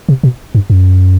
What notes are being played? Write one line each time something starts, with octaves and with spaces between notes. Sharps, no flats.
C3
B2
G2
F#2